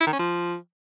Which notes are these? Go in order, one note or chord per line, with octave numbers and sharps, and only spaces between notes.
E4
D#3
C#4
F3